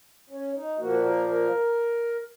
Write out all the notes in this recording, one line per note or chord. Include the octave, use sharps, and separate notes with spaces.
C#4
D#4
A#2 F3 A#3 F#4
A#4
A#4